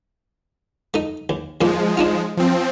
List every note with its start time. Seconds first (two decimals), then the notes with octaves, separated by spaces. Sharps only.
0.94 A3 D#4
1.29 D#2
1.61 D#2 A#2 F3 G#3 C6
1.97 D4 D#4 F4
2.37 F3 C4